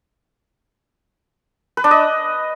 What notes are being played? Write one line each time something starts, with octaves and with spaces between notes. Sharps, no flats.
B4
D4
D#5